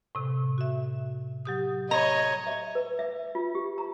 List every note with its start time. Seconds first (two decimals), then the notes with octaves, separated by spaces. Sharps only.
0.15 A2 C3
0.58 F#4 E5
1.45 F#3 G4 D#6
1.91 C#5 D#5 A#5
2.47 E5
2.75 B4
2.99 E5
3.35 F4
3.55 G4
3.78 A#5